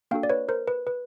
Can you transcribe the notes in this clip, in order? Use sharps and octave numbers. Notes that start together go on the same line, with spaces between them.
A#3 D4 F#4 A4 F5 G5
D5
B4 C#5
A#4 C5
B4
B4